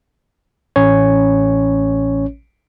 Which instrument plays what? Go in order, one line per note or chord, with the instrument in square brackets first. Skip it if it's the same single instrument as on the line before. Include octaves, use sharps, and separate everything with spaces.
[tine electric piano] A1 C#4 C#5